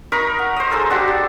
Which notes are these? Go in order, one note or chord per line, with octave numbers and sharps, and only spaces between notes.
D#4 A#4 B5 C#6
F#5
C5 D#5
G#3 D#4 A4 E6
D4 F#4 G4
G4